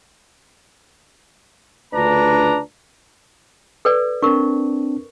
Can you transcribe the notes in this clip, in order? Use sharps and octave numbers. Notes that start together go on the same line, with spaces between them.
D2 C#3 D4 F4 B4 A#5
A4 B4 D5
C4 D4 A#4 C#6